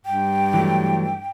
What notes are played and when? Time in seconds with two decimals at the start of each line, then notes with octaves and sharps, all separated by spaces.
0.06 G2 G5
0.54 E3 F#3 A3